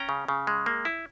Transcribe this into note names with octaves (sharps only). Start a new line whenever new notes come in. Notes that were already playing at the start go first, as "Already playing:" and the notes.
Already playing: C#4 G5 A#5
C#3
C#3
G#3
A#3
E4